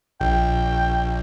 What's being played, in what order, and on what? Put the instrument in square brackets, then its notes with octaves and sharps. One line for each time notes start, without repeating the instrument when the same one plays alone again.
[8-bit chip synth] A#1 [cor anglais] G5